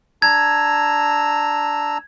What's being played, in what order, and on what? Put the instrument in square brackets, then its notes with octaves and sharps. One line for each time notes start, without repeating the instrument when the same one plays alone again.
[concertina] D4 A#5 E6 [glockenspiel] G#6